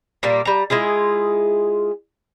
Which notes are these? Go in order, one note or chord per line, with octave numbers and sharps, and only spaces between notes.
A#2 G3 A#3
G3 A#5
G#3 E4 F4 G#4